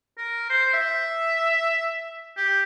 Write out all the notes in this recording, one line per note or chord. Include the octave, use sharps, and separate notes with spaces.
A#4
C5
E5
G4